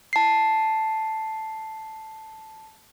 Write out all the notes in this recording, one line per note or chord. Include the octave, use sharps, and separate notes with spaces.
A5 C7